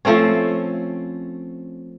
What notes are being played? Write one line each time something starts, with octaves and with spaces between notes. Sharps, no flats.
F3 A3 C4 C#4